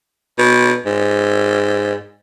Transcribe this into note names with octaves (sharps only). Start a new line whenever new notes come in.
B2
G#2